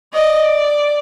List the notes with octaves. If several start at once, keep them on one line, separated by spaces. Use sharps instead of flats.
D5 D#5